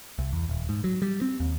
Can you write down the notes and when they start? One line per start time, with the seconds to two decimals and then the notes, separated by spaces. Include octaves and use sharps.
0.19 C2
0.33 E2
0.49 D#1
0.69 G#2
0.84 F#3
1.02 G3
1.22 C4
1.40 D#2